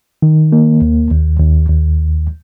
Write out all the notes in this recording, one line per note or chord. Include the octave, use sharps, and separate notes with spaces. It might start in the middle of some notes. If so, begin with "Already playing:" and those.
D#3
A#3
D#2
D#2
D#2
D#2